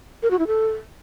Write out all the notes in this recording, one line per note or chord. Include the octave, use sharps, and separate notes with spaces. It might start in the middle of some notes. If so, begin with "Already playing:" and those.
A#4
F#4
E4
A4